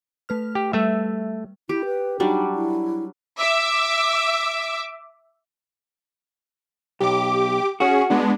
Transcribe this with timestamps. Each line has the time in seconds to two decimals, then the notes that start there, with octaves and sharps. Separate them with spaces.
0.29 A3 B4 F6
0.55 G4
0.73 G3 A3 E5
1.69 E4 G4
1.85 B4
2.20 F#3 G3 D4 D#4
2.55 E4
3.39 E5 D6
7.00 B1 G4 D6
7.80 C#4 F#4 G#4
8.10 G#3 B3 D4